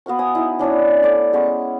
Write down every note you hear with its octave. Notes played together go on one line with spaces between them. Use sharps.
B3 F#4 F5 C#6
G#5 D#6
D#4 E4
C#4 D4 E4 C#5
A3 C#5 D5
G#3 B3 C#4 C#6